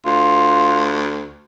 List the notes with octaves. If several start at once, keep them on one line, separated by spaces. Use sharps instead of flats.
D2 F4